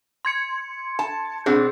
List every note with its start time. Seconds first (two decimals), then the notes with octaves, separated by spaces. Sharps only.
0.25 C6 G#6 C#7
0.99 A5
1.46 B2 C4 D4 G#4